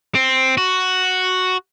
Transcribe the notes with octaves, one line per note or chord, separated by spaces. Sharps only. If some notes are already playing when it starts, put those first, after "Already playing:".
C4
F#4